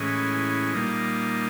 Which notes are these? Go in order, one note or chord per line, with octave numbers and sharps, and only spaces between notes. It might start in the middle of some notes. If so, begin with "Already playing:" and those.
Already playing: A2 E3 G#3 C#4
A#2 G3 A#3 D#4